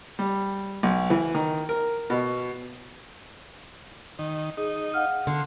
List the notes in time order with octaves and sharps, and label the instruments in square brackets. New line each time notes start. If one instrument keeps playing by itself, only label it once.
[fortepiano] G3
B1
E3
D#3
A#4
B2
[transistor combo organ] D#3
[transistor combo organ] D#4 [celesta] G#4
[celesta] F5 F#5 F6
[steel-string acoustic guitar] D3 [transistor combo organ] C6